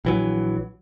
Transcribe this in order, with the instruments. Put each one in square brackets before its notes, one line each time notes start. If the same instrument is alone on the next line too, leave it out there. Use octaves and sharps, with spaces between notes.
[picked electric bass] A#1 E3 F#3